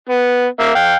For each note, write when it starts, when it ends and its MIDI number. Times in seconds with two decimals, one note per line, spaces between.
0.09 0.46 59
0.60 0.74 58
0.60 0.74 76
0.75 0.95 77
0.75 0.95 79